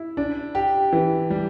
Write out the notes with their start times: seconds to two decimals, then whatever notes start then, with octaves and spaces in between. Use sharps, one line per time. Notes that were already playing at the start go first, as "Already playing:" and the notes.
Already playing: E4
0.17 D4
0.55 G4
0.93 E3
1.30 G3